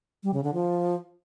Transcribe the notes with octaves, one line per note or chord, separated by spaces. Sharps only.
G3
C#3
D3
F3